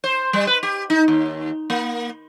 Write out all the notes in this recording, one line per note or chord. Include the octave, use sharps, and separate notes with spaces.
C5
G3
B4
G4
D#4
D#2
A#3